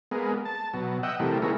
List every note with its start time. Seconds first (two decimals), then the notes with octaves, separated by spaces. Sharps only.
0.11 G#3 A#3 B3
0.45 A5
0.74 B2 F#3
1.03 D#5 E5 F#5 G5
1.20 C3 E3 G3 A3 A#3
1.42 G#3 A3 B3 C#4 E4 A#4